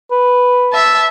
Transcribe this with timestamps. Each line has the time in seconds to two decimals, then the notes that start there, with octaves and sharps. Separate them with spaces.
0.11 B4
0.73 E5 A5